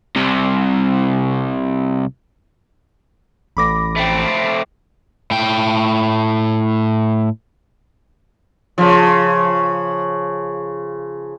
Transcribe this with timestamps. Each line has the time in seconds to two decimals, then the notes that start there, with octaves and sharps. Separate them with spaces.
0.16 C2 C3
3.57 A1 B5 D6 A#6
3.97 A3 C4
5.31 A2 G5
8.78 C#3 F3